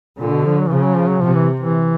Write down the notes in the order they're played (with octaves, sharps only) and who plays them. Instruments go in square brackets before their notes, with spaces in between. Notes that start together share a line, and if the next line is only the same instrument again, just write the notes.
[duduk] A#2 [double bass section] D3
[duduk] B2
F3
F#3
E3
[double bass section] C#3 [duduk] F3
[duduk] F#3
F3
F#3
[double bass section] C3 [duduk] F3
[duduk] E3
E3